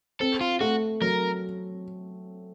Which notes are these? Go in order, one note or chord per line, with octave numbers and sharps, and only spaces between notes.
C4 A4
F4
A3 F#4
F#3 A#4